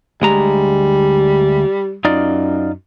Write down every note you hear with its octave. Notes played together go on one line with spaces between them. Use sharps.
D2 G3 G#3 A#5
F#2 D#4 F4 D5